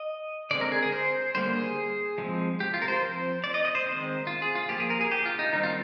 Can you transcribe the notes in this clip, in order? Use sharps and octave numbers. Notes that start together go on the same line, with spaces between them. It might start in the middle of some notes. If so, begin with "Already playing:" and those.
Already playing: D#5
D3 G#3 C4 D5
A#4
G#4
G#4
C5
D3 G3 A#3 C5
G#4
F3 G#3 C4
G4
F4
A#4
C5
F3 C4
D5
D#5
D#5
C5
D#3 G#3 C4
F4
G#4
F4
F3 A#3 G4
G#4
A#4
G#4
G4
F4
D#4
D#3 G3 C4 D#4
F4